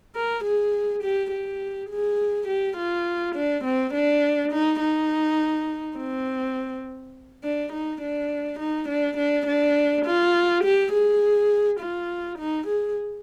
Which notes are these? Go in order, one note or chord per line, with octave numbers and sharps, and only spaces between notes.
A#4
G#4
G4
G4
G#4
G4
F4
D4
C4
D4
D#4
D#4
C4
D4
D#4
D4
D#4
D4
D4
D4
F4
G4
G#4
F4
D#4
G#4